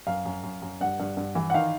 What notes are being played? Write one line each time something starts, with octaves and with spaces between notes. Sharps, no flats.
F#2 F5
F#2
F#2
F#2
G2 F#5
G2
G2
E3
F#5
D#3 F5